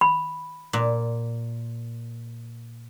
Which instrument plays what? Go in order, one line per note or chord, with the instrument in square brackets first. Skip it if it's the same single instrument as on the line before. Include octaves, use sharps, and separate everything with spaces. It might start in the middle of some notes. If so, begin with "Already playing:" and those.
[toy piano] B5
[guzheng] A#2